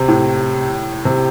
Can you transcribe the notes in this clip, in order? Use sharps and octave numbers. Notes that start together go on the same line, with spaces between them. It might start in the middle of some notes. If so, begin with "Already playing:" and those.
Already playing: C3
A2
C3